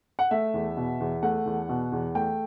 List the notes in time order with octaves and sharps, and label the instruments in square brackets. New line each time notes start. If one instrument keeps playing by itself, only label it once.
[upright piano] F#5
A3 E5
E2
B2
E2
A3 F#5
E2
B2
E2
A3 G5